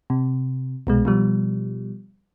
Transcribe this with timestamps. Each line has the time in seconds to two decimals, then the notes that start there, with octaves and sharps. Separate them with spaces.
0.10 C3
0.87 C2 B2 G#3
1.05 B2 F3 G3